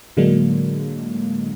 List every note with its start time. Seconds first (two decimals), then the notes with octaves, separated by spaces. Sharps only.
0.17 A2 D3 F#3 G#3 A#3 D4